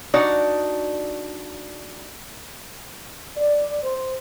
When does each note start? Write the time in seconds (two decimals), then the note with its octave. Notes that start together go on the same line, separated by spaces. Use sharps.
0.14 D4 D#4 F#4 D5
3.36 D5
3.84 C5